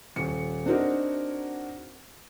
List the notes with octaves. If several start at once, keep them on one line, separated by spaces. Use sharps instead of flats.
D#1 C#7
C4 D4 D#4 F#4 G#4 A#4